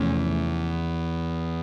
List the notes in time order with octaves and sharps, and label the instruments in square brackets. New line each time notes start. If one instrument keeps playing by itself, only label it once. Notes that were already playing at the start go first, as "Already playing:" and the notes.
Already playing: [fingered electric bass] E2 [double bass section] C3 F3 A3 C#4